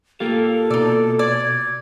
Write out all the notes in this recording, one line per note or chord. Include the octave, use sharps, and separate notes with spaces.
A#3 F4 G4 A4 F5
B2 D#4 D5 E6
D5 G#6